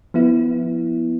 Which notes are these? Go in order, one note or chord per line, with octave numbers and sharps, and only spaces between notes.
F3 B3 E4